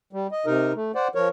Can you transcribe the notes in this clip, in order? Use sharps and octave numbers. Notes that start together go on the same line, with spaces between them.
G3
D#5
C3 D#4 A#4
A3
C5 D5 F#5
F3 A#4 C#5